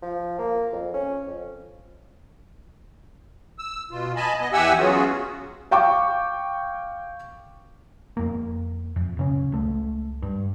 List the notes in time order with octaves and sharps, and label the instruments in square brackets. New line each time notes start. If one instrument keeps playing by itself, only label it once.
[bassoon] F3
A#3
F2
C#4
F2
[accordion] E6
B2 F4
D#5 G#5 A5 B5
B3 D#5
E2 G4 E5 F#5 G#5 E6
F#3 B3 C#4 F4 F#4 G#4
[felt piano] F5 G5 C#6 D6
[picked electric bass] F2 A#3
F2
D1 C#3 C#4
C#2 A3
G2